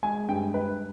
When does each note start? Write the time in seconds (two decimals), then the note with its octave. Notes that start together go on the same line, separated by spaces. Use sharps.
0.03 G#3 G#5
0.28 G2 G5
0.54 G2 B4